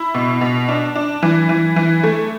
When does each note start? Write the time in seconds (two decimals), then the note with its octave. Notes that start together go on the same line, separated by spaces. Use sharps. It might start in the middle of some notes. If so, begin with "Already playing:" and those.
Already playing: E4
0.14 B2
0.41 B2
0.68 D4
0.96 D4
1.23 E3
1.49 E3
1.76 E3
2.03 A3